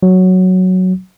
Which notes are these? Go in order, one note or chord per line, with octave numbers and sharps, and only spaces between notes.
F#3